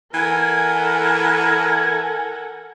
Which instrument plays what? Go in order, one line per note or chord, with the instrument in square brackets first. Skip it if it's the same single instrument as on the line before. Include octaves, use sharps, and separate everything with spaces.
[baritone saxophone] E3 [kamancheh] A4 F#5 [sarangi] A#4 [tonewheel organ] G#5